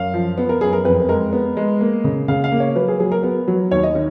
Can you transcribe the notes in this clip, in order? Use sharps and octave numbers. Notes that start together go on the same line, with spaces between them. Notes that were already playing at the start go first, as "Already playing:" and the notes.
Already playing: F#2 F5
F3
B3
A#4
F#2 G#4
A#4
F2 B4
G#3 A#4
B3
G#3
A#3
C#3
C#3 F5
F5
A#3
C#5
F#3 B4
G#4
F#3 G#4
A#4
B3
F#3
D#2 C#5
D#5
D#3